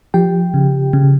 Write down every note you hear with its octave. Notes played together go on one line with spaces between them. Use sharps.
F3 G4 G5
C#3
C#3